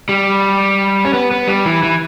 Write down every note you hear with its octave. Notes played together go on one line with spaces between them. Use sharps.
G3
C#4
B3
B3
G3
E3
E3